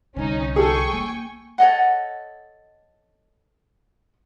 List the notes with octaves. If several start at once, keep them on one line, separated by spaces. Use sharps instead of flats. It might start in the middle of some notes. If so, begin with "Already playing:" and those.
C2 D3 C#4 D#4
G#4 A4 G5 G#5 C#6
A#3
A4 C#5 D#5 F#5